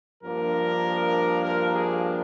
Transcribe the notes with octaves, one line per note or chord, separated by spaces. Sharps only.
G2 F3 A#3 D4 A#4
A#4
G#4